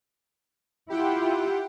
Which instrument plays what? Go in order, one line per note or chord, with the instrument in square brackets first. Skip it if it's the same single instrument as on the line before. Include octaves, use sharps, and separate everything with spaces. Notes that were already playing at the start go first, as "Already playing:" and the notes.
[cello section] E4 F4 [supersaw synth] G4 F#5 G5